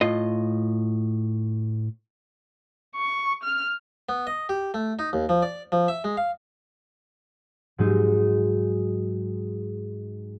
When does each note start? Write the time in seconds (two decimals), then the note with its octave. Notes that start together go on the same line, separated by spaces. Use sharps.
0.01 A2 F4 D#5
2.95 C#6
3.43 F6
4.09 B3
4.27 D#5
4.49 G4
4.74 A3
4.99 D#4
5.13 D#2
5.29 F3
5.42 D5
5.72 F3
5.88 E5
6.04 G#3
6.17 F5
7.78 G#2 F#3 G#3 D#4